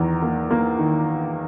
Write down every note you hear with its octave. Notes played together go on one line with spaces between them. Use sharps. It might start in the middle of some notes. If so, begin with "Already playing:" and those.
Already playing: E2 D#3 A#5
A#3
A#3
D#3